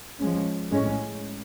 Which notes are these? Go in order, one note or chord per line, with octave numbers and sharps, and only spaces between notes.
F3 G#3 C#4
A2 G#3 C#4